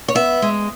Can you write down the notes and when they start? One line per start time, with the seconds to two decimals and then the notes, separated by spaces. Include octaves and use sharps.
0.08 C#5
0.15 B3 E5
0.42 G#3